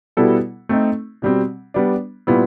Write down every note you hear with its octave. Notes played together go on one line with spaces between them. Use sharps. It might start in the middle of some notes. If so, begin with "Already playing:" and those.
B2 G3 B3 E4 A4
A3 C4 D#4
B2 G3 C4
G3 B3 D4
A#2 G3 B3 E4